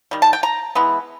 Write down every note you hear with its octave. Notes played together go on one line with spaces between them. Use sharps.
D#3 G3
A5
G5
A#5
E3 G#3 B3